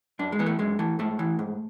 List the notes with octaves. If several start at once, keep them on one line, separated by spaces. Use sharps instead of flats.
F#2 D4
G#3
E3 B3
A3
F#2 G#3
E3 A3
G#2 A3
E3
G#2